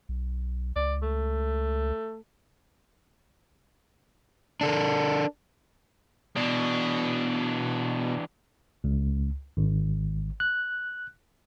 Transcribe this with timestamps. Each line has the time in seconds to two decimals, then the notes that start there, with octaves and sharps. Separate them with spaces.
0.09 B1
0.76 C#2 D5
1.02 A3
4.61 D4 A4 A#4
6.37 B2 E3 D4
8.84 C#2
9.57 G#1
10.40 F#6